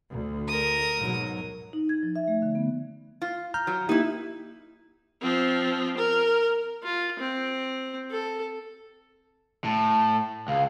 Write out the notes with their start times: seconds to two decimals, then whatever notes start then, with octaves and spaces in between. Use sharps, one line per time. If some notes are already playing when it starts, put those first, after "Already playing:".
0.10 D2
0.48 A#4 D#6
0.98 G#2 B2 F#3
1.73 D#4
1.89 G#6
2.03 F3
2.16 E5
2.28 A3
2.42 D3
2.55 B3
3.22 F4
3.54 A#5 F6 G6
3.67 F#3
3.89 A#3 D#4 E4 G4
5.21 F3 C4
5.98 A#4
6.83 F4
7.19 C4
8.11 A4
9.64 A2 A5
10.48 C#2 F5